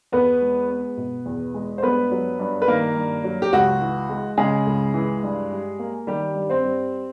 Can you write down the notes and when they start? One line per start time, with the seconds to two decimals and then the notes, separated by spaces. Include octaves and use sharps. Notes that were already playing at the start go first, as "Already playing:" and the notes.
0.12 E2 B3 B4
0.41 G#3
0.70 B3
0.97 B2
1.26 E2
1.54 G#3
1.78 C5
1.82 G2 B3 B4
2.11 F#3
2.39 G2
2.62 B4
2.68 D#3 A#3 A#4
2.96 G2
3.24 F#3
3.42 G4
3.53 C#2 F#4
3.80 E3
4.09 G#3
4.37 C#3 G#3 G#4
4.67 C#2
4.94 E3
5.23 G2
5.51 G3
5.79 A#3
6.07 D#3 G3 G4
6.35 G2
6.49 C4 C5
6.64 G3